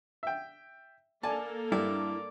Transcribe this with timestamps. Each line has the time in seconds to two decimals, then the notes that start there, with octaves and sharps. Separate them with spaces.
0.23 E5 G5
1.23 A#3 A4 A#4 D5 G#5 A5
1.72 G2 E4 D5